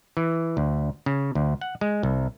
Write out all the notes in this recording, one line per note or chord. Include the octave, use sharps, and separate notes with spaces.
E3
D2
C#3
D2
F#5
G#3
C2